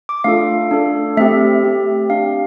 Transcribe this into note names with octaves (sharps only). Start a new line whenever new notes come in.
D6
A3 D4 F4 A4 F5
D4 A4
A3 C4 G4 E5
C4 G4
D4 G4 F5